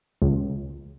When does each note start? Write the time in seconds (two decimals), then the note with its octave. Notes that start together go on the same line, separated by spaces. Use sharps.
0.22 C#2